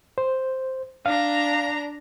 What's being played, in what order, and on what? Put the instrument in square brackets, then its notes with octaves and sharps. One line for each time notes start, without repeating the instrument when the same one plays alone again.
[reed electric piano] C5
[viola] D4 A#5 [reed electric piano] F5